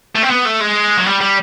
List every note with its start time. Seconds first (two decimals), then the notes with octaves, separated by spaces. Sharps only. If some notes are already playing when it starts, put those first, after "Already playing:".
0.15 A3
0.22 C4
0.30 B3
0.45 A3
0.60 G#3
0.97 F#3
1.06 G3
1.21 G3